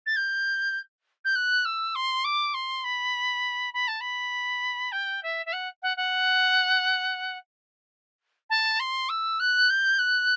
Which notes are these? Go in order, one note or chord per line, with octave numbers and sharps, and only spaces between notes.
A6
G6
G6
F#6
E6
C6
D6
C6
B5
B5
A5
B5
G5
E5
E5
F#5
F#5
F#5
A5
C6
E6
F#6
G6
F#6